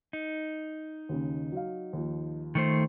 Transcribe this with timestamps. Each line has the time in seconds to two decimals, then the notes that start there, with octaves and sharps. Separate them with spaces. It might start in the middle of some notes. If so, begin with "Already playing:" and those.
0.13 D#4
1.09 D#2 C#3
1.52 F#3 F5
1.93 D#2 F3
2.55 D#3 A3 C5